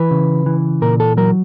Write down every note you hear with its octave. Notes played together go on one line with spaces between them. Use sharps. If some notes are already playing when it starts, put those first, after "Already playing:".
Already playing: E3 B4
C#3
E3
A#2 A#4
A4
F#3 A#4